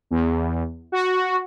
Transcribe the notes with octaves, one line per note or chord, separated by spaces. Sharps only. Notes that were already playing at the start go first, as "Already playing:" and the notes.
E2
F#4